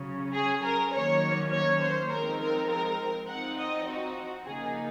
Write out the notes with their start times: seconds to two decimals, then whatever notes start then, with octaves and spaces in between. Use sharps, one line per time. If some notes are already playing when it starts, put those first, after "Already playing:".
Already playing: C#3 F#3 C#4
0.33 G#4
0.63 A#4
0.92 D#3 F#3 A#3 C#4 C#5
1.51 C#5
1.80 C5
2.10 F3 G#3 C4 D#4 A#4
2.40 A#4
2.69 A#4
3.28 F3 C4 D#4 F#5
3.58 D#5
3.86 F#4
4.46 C#3 F3 A#3 D#4 G#4